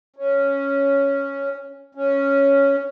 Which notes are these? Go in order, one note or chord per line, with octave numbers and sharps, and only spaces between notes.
C#4
C#4